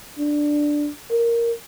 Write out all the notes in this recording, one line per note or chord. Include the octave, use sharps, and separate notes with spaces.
D4
A#4